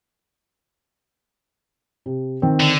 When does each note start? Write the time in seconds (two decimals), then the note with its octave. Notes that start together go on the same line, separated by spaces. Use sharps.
2.06 C3
2.42 D#3 C4
2.60 D3